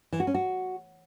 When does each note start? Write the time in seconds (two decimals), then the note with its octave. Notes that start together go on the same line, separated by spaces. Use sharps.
0.12 E3
0.20 F#4
0.27 C#4
0.35 F#4